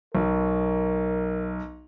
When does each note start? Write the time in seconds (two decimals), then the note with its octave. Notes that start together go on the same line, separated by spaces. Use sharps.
0.15 B1 A#4